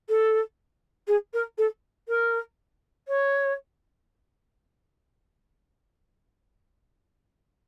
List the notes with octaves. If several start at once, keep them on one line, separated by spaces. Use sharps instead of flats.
A4
G#4
A#4
A4
A#4
C#5